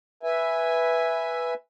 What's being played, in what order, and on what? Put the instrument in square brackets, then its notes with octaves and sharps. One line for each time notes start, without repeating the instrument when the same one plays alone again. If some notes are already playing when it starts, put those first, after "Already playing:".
[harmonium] B4 E5 G#5